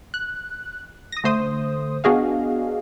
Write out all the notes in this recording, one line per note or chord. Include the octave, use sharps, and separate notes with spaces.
F#6
D#6 A#6
D3 A3 C5 D#6
B3 D4 F#4 G#4 D#5 F5